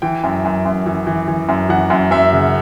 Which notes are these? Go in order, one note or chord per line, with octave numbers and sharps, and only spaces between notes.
E3 G5
F#2
F#2
F#2
E3
E3
E3
F#2
E3 F#5
F#2
F#2 E5
C#3